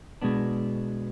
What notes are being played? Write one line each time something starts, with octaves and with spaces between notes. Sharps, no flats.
B2 G#3 B3 D4